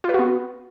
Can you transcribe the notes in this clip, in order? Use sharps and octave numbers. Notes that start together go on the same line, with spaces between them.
F4
B4
F#4
B3